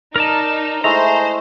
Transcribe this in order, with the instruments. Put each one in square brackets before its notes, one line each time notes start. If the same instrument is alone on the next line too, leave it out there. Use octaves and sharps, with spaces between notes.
[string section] D#4 [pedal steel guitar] A#4 D5 A5
[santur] G#3 A3 E4 [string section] C5 [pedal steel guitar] A#5